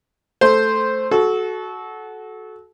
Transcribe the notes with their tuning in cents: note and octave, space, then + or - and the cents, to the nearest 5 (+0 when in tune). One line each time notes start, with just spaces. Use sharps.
A3 +0 C5 +0
F#4 +0 A4 -25